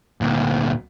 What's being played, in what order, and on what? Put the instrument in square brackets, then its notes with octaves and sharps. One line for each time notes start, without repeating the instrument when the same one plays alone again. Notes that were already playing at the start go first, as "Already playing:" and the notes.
[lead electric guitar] D2 A#2